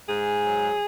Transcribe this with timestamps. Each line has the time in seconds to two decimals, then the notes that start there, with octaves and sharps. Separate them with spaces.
0.09 G#2 G#4
0.45 F#3